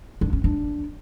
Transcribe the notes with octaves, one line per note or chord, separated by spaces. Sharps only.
D4
C#4
D4